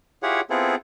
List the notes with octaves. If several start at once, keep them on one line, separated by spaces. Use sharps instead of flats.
E4 F4 G4 G#4 C#5 F#5
B3 C4 E4 F4 G#4 A4